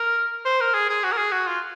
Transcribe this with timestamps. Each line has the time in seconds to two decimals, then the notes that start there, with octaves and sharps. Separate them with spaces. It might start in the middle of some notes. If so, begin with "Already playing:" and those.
Already playing: A#4
0.45 C5
0.60 A#4
0.74 G#4
0.90 G#4
1.03 F#4
1.12 A#4
1.17 G#4
1.32 F#4
1.47 F4